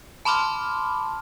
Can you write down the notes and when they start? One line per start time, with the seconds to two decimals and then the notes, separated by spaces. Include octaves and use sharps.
0.25 A5 B5 C6 D6 F6